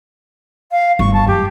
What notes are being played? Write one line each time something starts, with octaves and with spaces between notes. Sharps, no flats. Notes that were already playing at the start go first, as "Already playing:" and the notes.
F5
G1 C#6
A5
F#2 G4